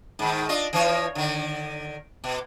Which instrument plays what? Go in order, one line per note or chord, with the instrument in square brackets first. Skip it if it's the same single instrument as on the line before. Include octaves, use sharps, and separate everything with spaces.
[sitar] G#2 D#3
D4 F4 D#5
E3 F3 C#5
D3 D#3
B2